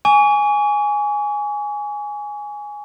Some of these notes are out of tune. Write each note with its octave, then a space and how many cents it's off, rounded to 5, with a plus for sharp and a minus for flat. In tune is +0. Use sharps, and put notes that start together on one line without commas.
G#5 +0 C#6 +40